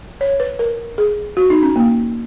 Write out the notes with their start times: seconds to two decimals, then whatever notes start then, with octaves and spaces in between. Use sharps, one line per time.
0.21 C#5
0.40 B4
0.59 A#4
0.98 G#4
1.37 F#4
1.50 D#4
1.62 C#4
1.76 A#3